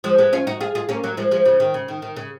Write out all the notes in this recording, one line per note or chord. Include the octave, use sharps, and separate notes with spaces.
F3 G#3
G#3 B3
C#4 F4
D#4 F#4
F4 G#4
F4 G#4
A#3 C#4
F#3 A#3
F3 G#3
F3 G#3
C#3 F3
D#3
C#3
D#3
D#3
C#3